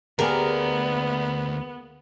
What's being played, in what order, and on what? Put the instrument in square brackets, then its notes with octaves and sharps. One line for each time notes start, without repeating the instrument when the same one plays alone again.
[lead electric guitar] D2 D5 [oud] A#3 G4 G#4 [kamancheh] B3 [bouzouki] A#4